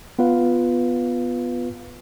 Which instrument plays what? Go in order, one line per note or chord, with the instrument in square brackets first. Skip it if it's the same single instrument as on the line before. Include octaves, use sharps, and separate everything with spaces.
[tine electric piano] B3 F4 B4 F5